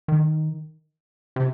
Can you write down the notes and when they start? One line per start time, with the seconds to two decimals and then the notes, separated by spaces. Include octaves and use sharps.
0.08 D#3
1.36 C3